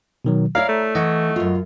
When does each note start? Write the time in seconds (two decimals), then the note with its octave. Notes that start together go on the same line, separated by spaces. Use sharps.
0.25 B2 D#3 F#3
0.55 E4 C#5 D5 F5 A#5
0.69 A3
0.95 E3 D#5 F#5 C#6
1.36 F#2 F4